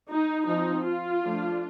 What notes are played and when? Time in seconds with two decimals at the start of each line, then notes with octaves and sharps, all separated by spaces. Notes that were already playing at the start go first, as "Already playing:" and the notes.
0.09 D#4
0.47 F3 C4 D#4
0.86 F4
1.25 F3 A3 D4